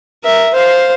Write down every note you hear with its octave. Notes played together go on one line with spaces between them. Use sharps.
A#4 E5
C5 F5